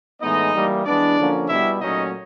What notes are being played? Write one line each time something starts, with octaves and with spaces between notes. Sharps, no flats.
A2 E3 G#3 B3 D#4 D#5
E3 G3 A#3
E3 G#3 B3 D4 D5
D3 F3 A#3 C#4
B2 G3 B3 E4 E5
A#2 F#3 A3 C#4 D#4 D#5